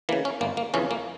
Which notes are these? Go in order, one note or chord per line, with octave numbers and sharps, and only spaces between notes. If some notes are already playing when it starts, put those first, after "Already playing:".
C#3 E3 A#3
C#4
G1 A#3
A#3
F2 C#3 E3 C#4
A#3